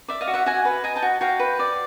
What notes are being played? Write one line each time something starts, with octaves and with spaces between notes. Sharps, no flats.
D5 E5
D#5 F5
F#4
E5 F#5
F#4 F#5 G#5
B4
D#5 G#5 A#5
G5 A5
F#4
F#4 F5 G5
B4
D5